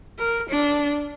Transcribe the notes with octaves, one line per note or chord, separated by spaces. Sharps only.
A#4
D4